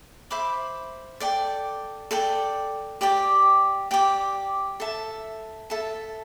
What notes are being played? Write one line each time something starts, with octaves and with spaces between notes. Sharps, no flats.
C5 E5 B5 D6
A4 D5 G5
A4 D5 G5
G4 D5 G5 D6
G4 D5 G5 D6
A4 E5 A5
A4 E5 A5